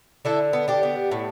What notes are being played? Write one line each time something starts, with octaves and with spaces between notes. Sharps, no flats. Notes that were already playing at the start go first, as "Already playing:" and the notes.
D3 E4 A4
B3
D4 G4
B3
A2